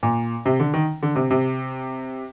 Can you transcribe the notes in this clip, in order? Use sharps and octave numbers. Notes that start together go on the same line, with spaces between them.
A#2
C3
D3
D#3
D3
C3
C3